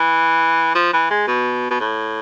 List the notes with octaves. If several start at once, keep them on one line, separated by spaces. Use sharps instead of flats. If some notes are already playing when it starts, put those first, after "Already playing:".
Already playing: E3
F3
E3
G#3
B2
B2
A2